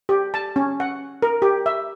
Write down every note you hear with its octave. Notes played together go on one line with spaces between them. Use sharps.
G4
A5
C#4
F#5
A#4
G4
E5